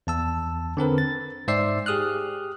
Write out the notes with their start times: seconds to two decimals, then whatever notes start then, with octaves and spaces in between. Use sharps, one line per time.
0.07 E2 A5 E6
0.77 D3 C4 A#4 B4
0.98 A6
1.48 G#2 C5 D5 E5 E6 C7
1.86 G4 G#4 D#6 F6 F#6